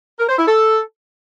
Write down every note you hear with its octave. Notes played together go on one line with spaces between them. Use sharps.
A#4
C5
E4
A4